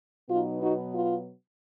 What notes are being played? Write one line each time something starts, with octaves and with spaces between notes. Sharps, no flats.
B2 F#3 B3 D#4 F4
D#4 F#4
F4